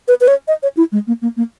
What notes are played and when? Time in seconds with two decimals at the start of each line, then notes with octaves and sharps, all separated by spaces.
0.08 B4
0.21 B4
0.28 C#5
0.48 D#5
0.63 C#5
0.77 E4
0.92 G#3
1.07 A#3
1.22 A#3
1.37 A#3